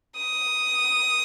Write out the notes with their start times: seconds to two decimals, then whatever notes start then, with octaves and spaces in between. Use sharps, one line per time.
0.17 D#6